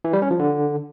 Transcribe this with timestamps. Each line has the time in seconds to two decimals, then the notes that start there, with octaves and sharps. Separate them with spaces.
0.04 E3
0.13 G3
0.22 C#4
0.31 F3
0.39 D3